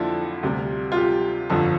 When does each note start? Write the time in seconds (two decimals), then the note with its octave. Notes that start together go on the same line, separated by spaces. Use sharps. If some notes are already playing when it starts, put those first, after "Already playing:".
Already playing: F2 D3 F3 A#3 D4 E4 F4 A4
0.43 D2 C3 G3
0.92 F4
0.97 G4
1.50 G1 F2 D3 F3 A4